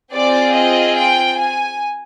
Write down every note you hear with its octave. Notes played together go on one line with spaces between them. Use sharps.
C4 F4 G#4 D5
D#5
G5
G#5